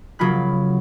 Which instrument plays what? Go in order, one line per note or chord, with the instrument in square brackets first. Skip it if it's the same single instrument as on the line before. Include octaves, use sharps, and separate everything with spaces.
[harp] C#3 F#3 A#3 F4 B5 F#6